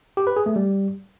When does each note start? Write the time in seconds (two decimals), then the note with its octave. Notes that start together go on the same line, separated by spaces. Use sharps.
0.17 G4
0.27 B4
0.36 G#4
0.46 A3
0.56 G3